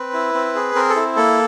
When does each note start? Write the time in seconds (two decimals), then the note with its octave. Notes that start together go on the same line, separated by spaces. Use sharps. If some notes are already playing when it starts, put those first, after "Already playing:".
Already playing: C4 B4
0.13 E4
0.34 C4
0.55 G#4
0.75 C4 A#4
0.90 A4
0.96 E4
1.16 A#3 A4